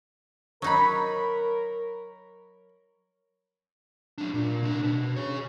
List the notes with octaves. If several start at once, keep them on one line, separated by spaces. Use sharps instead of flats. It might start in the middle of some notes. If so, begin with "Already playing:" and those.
F#3 D#4 A#4 C#5 B5
F#3 D4
A#2
C2 D4
B2
G#4 C#5